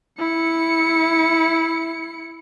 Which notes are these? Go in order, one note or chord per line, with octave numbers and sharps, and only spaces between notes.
E4 C#7